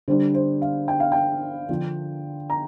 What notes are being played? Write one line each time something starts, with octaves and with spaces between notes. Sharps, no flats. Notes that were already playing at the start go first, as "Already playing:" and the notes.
D3 G3 D4 C5
C5
F5
G5
F5
G5
D3 F3 D4
A#5